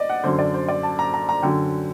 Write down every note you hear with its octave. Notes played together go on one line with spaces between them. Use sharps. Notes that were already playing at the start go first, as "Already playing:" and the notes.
Already playing: D5 D#5
F#5
F#2 D3 C5
D5
C5
D5
A5
A#5
A#5
A#5
F#2 D3 G5